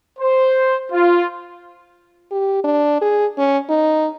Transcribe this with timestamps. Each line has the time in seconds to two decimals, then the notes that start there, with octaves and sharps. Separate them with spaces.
0.19 C5
0.92 F4
2.31 G4
2.64 D4
3.01 G#4
3.38 C#4
3.69 D#4